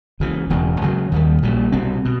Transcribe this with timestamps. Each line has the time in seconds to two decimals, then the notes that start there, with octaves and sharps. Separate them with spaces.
0.20 C#2 C#3 E3
0.50 E1 E2 C#3
0.82 C#2 C#3 F#3
1.12 D#2 D#3 G3
1.43 A#1 A#2 G3
1.72 C2 B2 G3 C4
2.05 B2